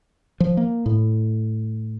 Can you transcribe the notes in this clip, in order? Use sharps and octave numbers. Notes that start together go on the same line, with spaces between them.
F3
A#3
A2